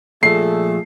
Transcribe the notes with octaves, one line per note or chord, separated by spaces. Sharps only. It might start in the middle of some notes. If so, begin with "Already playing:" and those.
A#2 F3 A3 G#4 A4 C7